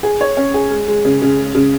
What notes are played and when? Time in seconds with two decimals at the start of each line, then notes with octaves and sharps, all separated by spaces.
0.03 G#4
0.21 C#5
0.37 C#4
0.54 G#4
0.70 G#3
0.88 G#3
1.05 C#3
1.22 C#3
1.39 G#3
1.55 C#3